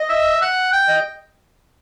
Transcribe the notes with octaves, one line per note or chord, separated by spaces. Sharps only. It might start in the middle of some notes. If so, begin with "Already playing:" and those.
Already playing: D#5
E5
F#5
G5
D#5